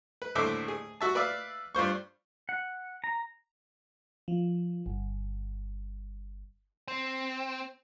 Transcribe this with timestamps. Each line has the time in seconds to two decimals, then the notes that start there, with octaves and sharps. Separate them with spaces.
0.22 B4
0.35 D#2 A2 D3 C5 E5 D6
0.68 G#4
1.01 F#4 E5 A5
1.15 B4 D5 E5 F5
1.75 G2 F4 C5 C#6
2.49 F#5
3.04 A#5
4.28 F3
4.86 G1
6.88 C4